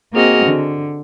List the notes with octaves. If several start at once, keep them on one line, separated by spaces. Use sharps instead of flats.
A#3 C4 F#4 G#4 D#5 F6
D3